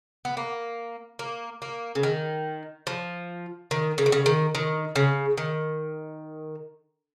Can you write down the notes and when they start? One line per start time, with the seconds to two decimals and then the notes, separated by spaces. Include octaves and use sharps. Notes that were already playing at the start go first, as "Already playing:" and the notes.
0.25 B3
0.37 A#3
1.19 A#3
1.62 A#3
1.95 C#3
2.03 D#3
2.87 F3
3.71 D#3
3.98 C#3
4.06 D#3
4.12 C#3
4.26 D#3
4.55 D#3
4.95 C#3
5.38 D#3